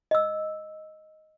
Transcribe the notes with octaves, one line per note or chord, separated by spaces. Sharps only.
D#5 E6